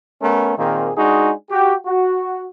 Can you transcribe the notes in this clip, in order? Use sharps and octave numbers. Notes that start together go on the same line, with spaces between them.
A3 B3 C#4 A#4
A#2 D#3 A#3 C4 G#4
G#3 D4 D#4 F#4 G#4
F#4 G4
F#4